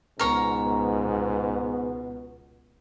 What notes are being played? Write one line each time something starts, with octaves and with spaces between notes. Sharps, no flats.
C#2 G#2 B2 B3 A#4 C#5 A#5